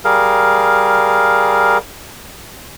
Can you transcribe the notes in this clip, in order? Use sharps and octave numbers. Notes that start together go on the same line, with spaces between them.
G3 G#4 A#4 F5